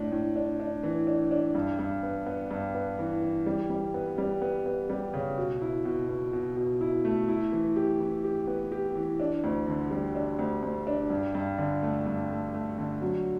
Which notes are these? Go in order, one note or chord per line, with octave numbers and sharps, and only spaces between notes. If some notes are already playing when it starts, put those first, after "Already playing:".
Already playing: A2 D4
A2
D4
D4
E3
D4
D4
G2
G2
B3
B3
G2
B3
E3
E3
G3
G3
B3
G3
B3
B3
G3
C#3
B2
E4
B2
B2
B2
B2
E4
A3
E4
E3
G4
E3
G4
B3
G4
E3
D4
D2
D3
G3
D4
D2
D2
D4
G2
G2
D3
A3
G2
A3
A3
D3
F#3